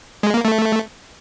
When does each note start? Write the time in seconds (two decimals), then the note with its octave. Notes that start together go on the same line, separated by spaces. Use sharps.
0.23 G#3
0.34 A#3
0.45 A3